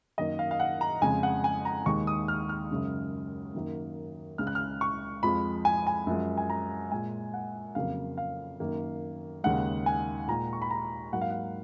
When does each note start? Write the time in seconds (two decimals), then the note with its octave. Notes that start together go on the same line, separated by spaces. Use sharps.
0.18 F#2 D#3 A#3 D#5
0.39 F5
0.51 F5
0.60 F#5
0.81 A#5
1.02 F2 C#3 G#3 G#5
1.23 F#5
1.44 G#5
1.65 A#5
1.86 D#2 D#3 G#3 C#6
2.07 D#6
2.28 F6
2.49 F6
2.70 F#2 C#3 G#3
3.55 F#2 D#3 A#3
4.38 C#2 C#3 G#3 F6
4.47 F#6
4.55 F6
4.81 C#6
5.23 F2 F3 G#3 B5
5.65 G#5
5.87 G#5
6.07 F#2 F3 G#3
6.38 G#5
6.50 A#5
6.91 A#2 G#3 G#5
7.34 F#5
7.75 F2 C#3 F#3 A#3 F5
8.18 F5
8.60 F#2 D#3 A#3
9.44 D#2 C#3 G#3 F#5
9.86 G#5
10.28 A#2 G#3 A#5
10.53 C#6
10.62 B5
10.71 A#5
11.13 G#2 F#3 A#3 F#5
11.21 F5
11.30 F#5